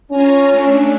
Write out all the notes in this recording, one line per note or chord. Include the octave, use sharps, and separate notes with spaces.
C#4 F4 G#5 A#5
A3 D4